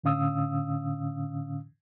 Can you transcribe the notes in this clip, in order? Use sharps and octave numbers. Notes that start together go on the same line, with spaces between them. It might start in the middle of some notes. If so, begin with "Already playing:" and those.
A2 D3 C#4 F5 D#6 E6